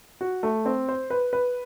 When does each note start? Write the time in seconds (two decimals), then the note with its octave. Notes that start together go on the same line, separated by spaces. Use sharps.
0.21 F#4
0.43 A3
0.66 C4
0.89 C5
1.10 B4
1.33 B4